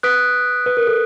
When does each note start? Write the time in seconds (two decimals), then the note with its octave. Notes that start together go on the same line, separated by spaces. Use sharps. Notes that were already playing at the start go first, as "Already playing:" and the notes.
0.03 B4 D#6 F#6 B6 D7
0.66 B4
0.77 A#4
0.87 A4